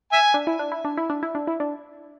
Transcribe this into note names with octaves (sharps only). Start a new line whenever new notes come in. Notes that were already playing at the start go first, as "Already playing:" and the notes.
E5 G#5
D4
E4
D4
E4
D4
E4
D4
E4
D4
E4
D4